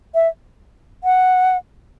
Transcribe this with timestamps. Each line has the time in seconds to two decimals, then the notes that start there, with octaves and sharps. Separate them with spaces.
0.15 E5
1.04 F#5